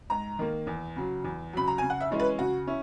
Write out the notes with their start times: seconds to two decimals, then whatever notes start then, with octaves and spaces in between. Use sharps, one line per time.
0.10 G#2 A#5
0.39 D#3 A#3
0.67 E2
0.96 C#3 F#3
1.24 E2
1.53 C#3 F#3 B5
1.68 A#5
1.78 C#3 G#5
1.90 F#5
2.00 E5
2.11 E3 G#3 C#4 E4
2.20 B4
2.38 C#3 F#4
2.67 C#4 E4